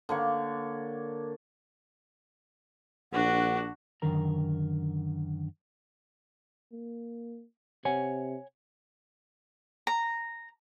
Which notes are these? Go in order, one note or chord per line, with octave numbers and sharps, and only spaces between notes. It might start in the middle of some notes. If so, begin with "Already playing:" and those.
D3 A#3 C#5
A#1 D4 F#4 F#5
F#2 D3 D#3 A#4 A#5
A#3
C3 C#5 F#5 G#5
A#5